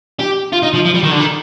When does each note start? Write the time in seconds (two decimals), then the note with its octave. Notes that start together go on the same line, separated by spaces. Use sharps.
0.19 G4
0.53 F4
0.63 D#4
0.74 F3
0.85 F3
0.95 G3
1.03 D#3
1.11 D3
1.19 D#3